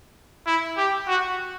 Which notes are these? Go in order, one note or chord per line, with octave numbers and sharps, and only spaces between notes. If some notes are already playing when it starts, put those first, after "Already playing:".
E4
G4
F#4